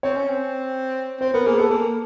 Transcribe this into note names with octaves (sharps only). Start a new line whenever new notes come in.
C4 C#5
C#4
C4
C4 C5
B3 A#4
A#3 G#4
B3 A4
A#3